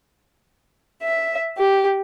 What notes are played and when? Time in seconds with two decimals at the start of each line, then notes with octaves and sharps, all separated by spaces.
1.02 E5
1.57 G4